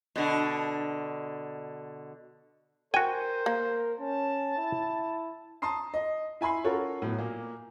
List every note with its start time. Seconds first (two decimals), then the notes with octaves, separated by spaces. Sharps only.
0.16 B2 D3
2.94 F#4 A#4 C5 G5 G#5
3.46 A#3
4.00 C#4 A5
4.57 E4
5.62 A5 A#5 C6 D#6 C7
5.94 D#5
6.41 E4 G#5 B5 C6 C7
6.64 C#4 F4 F#4 A4 A#4 C#5
7.02 A2 F#3 B3
7.18 A#2 A#3